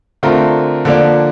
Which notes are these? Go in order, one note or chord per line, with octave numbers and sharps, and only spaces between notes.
D3 A3 C4 F4 A#4
D3 F3 A#3 D4